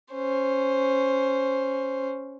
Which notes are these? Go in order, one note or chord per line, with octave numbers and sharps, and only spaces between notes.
C#4 C5